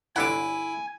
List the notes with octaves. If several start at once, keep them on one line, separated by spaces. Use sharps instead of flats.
G1 D3 E4 F#5 G#5 D6